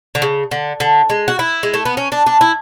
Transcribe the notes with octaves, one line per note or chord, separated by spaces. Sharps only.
D3
C#3
D3
D3
G#3
F#4
E4
G#3
A3
B3
C#4
D4
D4
E4